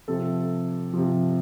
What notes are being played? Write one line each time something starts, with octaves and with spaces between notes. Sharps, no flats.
C3 F3 A4
C3 F3